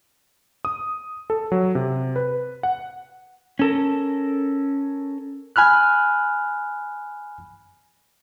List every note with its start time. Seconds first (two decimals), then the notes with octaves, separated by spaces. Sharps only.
0.65 D#6
1.30 A4
1.52 F#3
1.75 C3
2.16 B4
2.63 F#5
3.59 C#4 A4 A#4
5.56 G#5 B5 F6 F#6